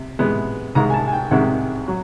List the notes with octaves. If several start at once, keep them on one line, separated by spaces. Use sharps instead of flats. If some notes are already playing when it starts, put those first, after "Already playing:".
Already playing: C3
C3 E3 G#3 B3
C2 C3 D#3 G#3 A#5
G#5
A5
G#5
G5
C2 C3 D#3 G#3 F#5
F#3